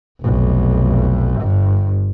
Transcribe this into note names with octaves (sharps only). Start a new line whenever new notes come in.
F1 B1
G1 G2